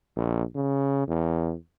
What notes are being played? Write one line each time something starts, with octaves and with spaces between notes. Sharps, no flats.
A#1
C#3
E2